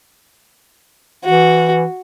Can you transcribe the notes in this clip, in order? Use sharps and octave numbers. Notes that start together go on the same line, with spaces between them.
E3 F#4